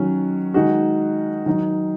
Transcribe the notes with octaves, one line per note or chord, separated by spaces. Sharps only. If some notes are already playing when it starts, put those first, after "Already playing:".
Already playing: D#3 F#3 C#4
D#3 G#3 D#4 F#4
D#3 F#3 D#4